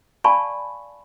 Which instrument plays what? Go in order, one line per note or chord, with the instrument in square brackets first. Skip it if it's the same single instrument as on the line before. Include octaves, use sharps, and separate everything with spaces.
[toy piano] D5 F5 G#5 A5 B5 C#6